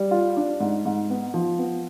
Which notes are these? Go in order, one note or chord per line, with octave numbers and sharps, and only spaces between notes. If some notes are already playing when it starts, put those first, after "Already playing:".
Already playing: G3
F4
D4
G#2
G#2
B3
F3
B3